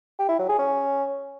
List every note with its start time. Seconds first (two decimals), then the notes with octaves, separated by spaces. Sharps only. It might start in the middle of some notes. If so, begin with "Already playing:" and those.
0.19 G4
0.29 E4
0.39 F#3
0.49 G#4
0.59 C#4